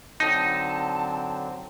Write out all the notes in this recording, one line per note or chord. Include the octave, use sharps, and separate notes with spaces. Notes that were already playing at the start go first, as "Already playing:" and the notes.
D3 F#3 C4 D#4 A5